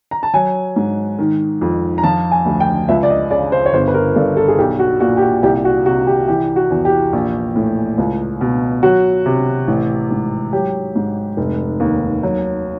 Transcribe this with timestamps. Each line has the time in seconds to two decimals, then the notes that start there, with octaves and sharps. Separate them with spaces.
0.11 A#5
0.23 A5
0.34 F#3 G#5
0.76 G#2
1.19 D#3
1.61 F2
1.98 A#5
2.03 F3 A5
2.31 G#5
2.45 D2
2.60 G5
2.89 C#2 E5
3.03 D5
3.10 D#5
3.31 C#3 D5
3.52 C5
3.66 C#5
3.73 G1 C5
3.88 B4
3.94 A#4
4.15 G2 A4
4.37 A4
4.48 G#4
4.58 B1 G4
4.79 F#4
5.00 A#2 F#4
5.17 G4
5.21 F#4
5.43 C2 G4
5.65 F#4
5.86 C3 F#4
6.07 G4
6.28 E3 G4
6.56 F#4
6.71 E2
6.85 G4
7.13 A#1
7.56 A2
7.98 C#2
8.41 B2
8.83 F#3 F#4
9.26 C3
9.68 A1
10.11 G#2
10.53 F#3 G4
10.96 G#2
11.37 F1
11.80 D#2
12.23 F#3